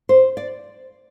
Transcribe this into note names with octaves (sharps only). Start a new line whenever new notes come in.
C5
D5